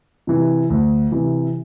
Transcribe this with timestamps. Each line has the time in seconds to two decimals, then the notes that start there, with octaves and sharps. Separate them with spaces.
0.27 C3 E3
0.70 D2
1.12 C3 E3